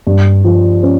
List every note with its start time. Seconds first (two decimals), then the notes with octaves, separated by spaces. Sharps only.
0.07 G2
0.44 F3
0.83 C#4